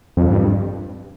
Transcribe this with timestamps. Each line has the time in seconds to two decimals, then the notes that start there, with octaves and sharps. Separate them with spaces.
0.17 F2
0.31 G2